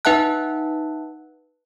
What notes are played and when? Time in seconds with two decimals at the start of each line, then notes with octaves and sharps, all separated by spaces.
0.05 D#4 B4 E5 F#5 A5 F#6